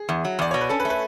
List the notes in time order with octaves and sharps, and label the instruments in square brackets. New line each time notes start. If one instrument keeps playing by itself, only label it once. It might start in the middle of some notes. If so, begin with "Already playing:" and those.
Already playing: [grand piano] G#4
[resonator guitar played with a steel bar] E2
F#3
[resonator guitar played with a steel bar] E2 [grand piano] D5
[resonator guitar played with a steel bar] B2 [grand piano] C#5
[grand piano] B4
[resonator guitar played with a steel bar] C#4 [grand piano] A4
[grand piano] B4
[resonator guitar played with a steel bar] A3
[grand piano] B4